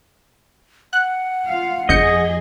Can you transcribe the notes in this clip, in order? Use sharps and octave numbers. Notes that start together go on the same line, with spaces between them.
F#5 F#6
F4 F5
G1 F2 G#4 D#5 G6 C#7